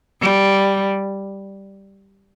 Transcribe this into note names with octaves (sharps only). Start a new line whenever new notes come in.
G3